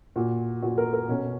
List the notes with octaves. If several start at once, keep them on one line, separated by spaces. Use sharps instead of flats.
A#2 F#4
A#2 F#4
A#4
A#4
B2 C#4